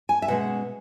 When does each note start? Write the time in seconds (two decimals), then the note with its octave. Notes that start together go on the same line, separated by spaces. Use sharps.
0.09 G#5
0.22 E5
0.28 B2 G#3 C#4 F#5